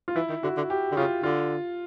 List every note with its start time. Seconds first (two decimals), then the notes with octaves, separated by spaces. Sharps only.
0.08 F4
0.16 E3 E4
0.29 D#3
0.43 D3 F#4
0.57 D3
0.70 G4
0.91 D3
0.96 C#3 F4
1.23 D3 F4